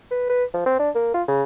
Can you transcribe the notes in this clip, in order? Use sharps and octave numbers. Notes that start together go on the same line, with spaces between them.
B4
B4
F3
C4
D4
A#3
F4
C#3